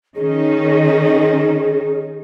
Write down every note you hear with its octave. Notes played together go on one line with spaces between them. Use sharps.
D#3 C#4 D#4 G#4